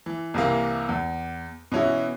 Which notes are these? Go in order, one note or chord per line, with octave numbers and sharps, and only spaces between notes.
E3
C2 C3 E3 A#3
E2
B2 E3 C#4 E4 F#4